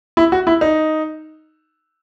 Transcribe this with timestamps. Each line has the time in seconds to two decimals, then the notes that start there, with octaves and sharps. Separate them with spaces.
0.17 E4
0.32 F#4
0.47 E4
0.61 D#4